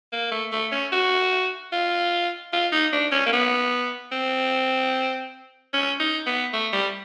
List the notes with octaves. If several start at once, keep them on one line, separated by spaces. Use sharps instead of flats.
A#3
A3
A3
C#4
F#4
F4
F4
D#4
D4
C#4
A#3
B3
C4
C#4
D#4
B3
A3
G3